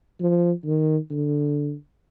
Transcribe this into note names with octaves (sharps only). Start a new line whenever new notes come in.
F3
D#3
D3